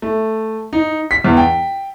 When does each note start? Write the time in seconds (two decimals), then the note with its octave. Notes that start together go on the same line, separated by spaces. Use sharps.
0.02 A3
0.73 D#4
1.11 B6
1.24 E2
1.37 G5